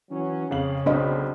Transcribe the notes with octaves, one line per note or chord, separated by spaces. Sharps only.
E3 F#3 C#4
F2 C#3 F5 F#7
B1 C4 D4 D#5 B5